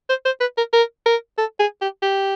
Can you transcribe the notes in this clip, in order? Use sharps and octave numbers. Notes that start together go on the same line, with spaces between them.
C5
C5
B4
A#4
A#4
A#4
A4
G#4
G4
G4